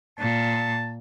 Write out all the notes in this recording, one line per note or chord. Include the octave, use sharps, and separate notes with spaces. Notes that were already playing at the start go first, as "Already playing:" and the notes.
A#2 A5